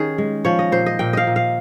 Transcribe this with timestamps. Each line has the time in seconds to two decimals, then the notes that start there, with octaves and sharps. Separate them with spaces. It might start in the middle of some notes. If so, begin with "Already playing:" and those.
Already playing: D#3 C#4 G#4
0.18 G#3
0.45 F3 C#5
0.59 D#5
0.72 A#2 C5
0.86 D#5
0.99 A#2 G5
1.13 D#5 F5
1.27 A#2
1.36 F5